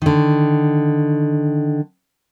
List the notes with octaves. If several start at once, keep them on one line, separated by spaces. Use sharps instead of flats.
D3 D#3